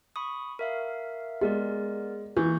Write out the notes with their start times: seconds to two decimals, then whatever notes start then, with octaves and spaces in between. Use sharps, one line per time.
0.16 B5 C#6 D#6
0.59 A#4 E5 F5
1.41 G#3 B3 A#4 D5
2.37 E3 A#3 C#6 G6